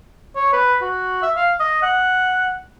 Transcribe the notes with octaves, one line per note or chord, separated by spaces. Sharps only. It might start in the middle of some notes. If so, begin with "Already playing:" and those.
C#5
B4
F#4
E5
F5
D#5
F#5